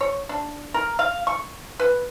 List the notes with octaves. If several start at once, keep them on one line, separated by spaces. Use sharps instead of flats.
C#5
D4
A#4
F5
C#6
B4